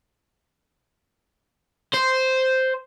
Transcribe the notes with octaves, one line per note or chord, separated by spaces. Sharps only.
C5